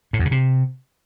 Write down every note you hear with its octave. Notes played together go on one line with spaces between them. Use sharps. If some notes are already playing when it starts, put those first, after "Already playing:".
A2
E2
C#3
C3